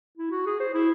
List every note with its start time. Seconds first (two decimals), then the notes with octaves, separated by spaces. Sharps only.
0.17 E4
0.31 F#4
0.46 G#4
0.60 C5
0.74 E4